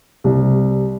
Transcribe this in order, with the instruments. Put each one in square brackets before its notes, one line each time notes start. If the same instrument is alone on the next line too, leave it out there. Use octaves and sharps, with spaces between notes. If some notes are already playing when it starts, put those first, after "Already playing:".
[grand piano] C2